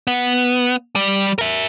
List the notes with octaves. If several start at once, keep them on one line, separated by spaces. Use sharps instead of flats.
B3
G3
A#4 E5